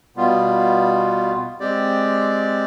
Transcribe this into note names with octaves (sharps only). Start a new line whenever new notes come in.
B2 G3 B3 F4
G#3 C4 G4 D5